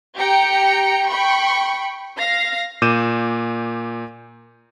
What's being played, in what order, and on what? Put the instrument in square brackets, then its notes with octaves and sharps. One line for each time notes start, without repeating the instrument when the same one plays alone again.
[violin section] G4 G5 A#5 C#7
G5 B5 C#6
F5 A#6
[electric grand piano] A#2 D6 G6 D#7 E7